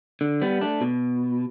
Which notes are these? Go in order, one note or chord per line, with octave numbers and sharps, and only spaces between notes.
D3
G3 B3
A3 D4
B2